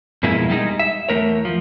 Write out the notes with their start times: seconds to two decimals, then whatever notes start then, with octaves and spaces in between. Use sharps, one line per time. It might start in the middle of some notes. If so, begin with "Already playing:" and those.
0.23 F2 B2 G#3 A#3 E4
0.50 G3 G#3 D#4
0.79 E5
1.09 E2 A3 A#4 C#5
1.45 F3